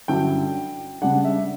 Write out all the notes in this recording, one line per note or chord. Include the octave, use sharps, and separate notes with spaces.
G2 D3 F#3 C#4 E4 G5
C#3 G3 D4 F#5
E5